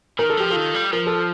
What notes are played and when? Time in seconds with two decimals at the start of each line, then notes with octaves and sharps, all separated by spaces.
0.19 D#3 A#4
0.30 A4
0.37 F3 G4
0.50 F4 A4
0.56 D#3
0.75 G3
0.93 F3 A#4
1.07 A4